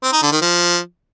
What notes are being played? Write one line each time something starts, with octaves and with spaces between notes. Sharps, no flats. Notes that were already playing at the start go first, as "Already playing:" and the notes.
C4
D#4
D3
D#3
F3